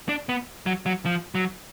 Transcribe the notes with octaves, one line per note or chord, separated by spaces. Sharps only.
D4
B3
F#3
F#3
F3
F#3